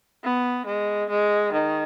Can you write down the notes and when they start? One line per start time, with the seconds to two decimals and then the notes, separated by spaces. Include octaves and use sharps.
0.24 B3
0.67 G#3
1.10 G#3
1.53 D#3